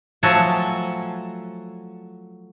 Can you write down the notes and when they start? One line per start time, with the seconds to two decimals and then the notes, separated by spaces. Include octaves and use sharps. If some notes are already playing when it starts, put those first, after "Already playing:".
0.23 F3 F#3 A3 F#4 G#5 A5